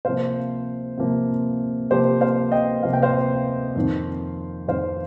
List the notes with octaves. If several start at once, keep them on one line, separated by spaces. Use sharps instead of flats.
C3 F3 A#3 C5 F5
C3 F3 A#3
C3 F3 A#3 G4 C5
C5 F5
D#5 G5
C3 F3 A#3 F5
G5
C5 F5
F2 D#3 C4
F2 D#3 C4 C5 F5